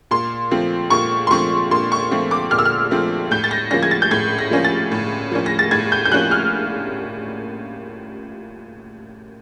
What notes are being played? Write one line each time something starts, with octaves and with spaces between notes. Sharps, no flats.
A#2 C6
F3 A3 C4
A#2 C#6
C6
F3 A3 C4 C#6
A#2 C6
C#6
F3 A3 C4
D6
A#2 F6
E6
F6
F3 A3 C4
A2 G6
A6
A#6
F3 A#3 C#4 A#6
G#6
A6
G6
A2 G#6
A#6
F3 A#3 C#4
A6
A2
F3 A#3 C#4
A#6
A6
A2 G#6
G6
G6
F3 A#3 C#4 F#6
F6